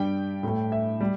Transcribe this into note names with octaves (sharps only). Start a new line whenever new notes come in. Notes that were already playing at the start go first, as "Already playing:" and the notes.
Already playing: G2 G3 G5
A2 A3
E5
G3